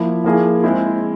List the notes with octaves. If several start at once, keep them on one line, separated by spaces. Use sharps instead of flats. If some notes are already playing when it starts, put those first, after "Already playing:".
Already playing: F3 A#3 E4
F3 A#3 E4 G#4
G#3 C4 E4